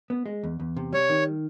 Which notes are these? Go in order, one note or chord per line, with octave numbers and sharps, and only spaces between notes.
B3
G#3
E2
E2
C3
G3 C#5
D#3